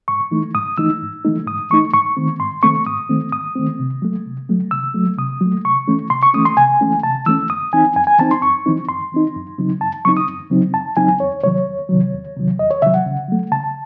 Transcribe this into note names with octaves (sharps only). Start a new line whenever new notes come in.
G#2 C#6
E3 A3 D#4
G#2 D#6
E3 A3 D#4 E6
G#2
E3 A3 D#4
G#2 D#6
E3 A3 D#4 C#6
G#2 C#6
D#3 A3 C4
G#2 C6
D#3 A3 C4 C#6
G#2 D#6
D#3 A3 C4
G#2 D#6
D#3 A3 C4
C3
F#3 A3
C3
F#3 A3
C3 E6
F#3 A3
C3 D#6
F#3
A3
C3 C#6
E3 A3 C#4
C3 C6
C#6
E3 A3 C#4 D#6
C6
C3 G#5
E3 A3 C#4
C3 A5
E3 A3 C#4 E6
F#2 D#6
E3 C4 D#4 G#5
F#2 G#5
G#5
E3 C4 D#4 A5
C6
F#2 C#6
E3 C4 D#4
F#2 C6
E3 C4 D#4
F#2
C#3 F#3 C4 D#4
F#2 A5
C#3 F#3 C4 D#4 C#6
D#6
F#2
C#3 F#3 C4 D#4
F#2 A5
C#3 F#3 C4 D#4 G#5
E2 C#5
C3 D#3 F#3 C#5
E2
C3 D#3 F#3
E2
C3 D#3 F#3
E2 D#5
C#5
C3 D#3 F#3 E5
F#5
C#3
F#3 A3
C#3 A5